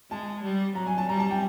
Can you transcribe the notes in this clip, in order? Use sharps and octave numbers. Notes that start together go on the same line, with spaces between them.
G#3 A5
G3
F#3 A#5
G#5
A5
G3 A#5
A5
G5